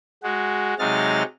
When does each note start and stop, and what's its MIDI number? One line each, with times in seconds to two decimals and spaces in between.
0.23 0.74 56
0.23 0.74 66
0.79 1.23 48
0.79 1.23 54
0.79 1.23 56
0.79 1.23 63
0.79 1.23 89
0.79 1.23 93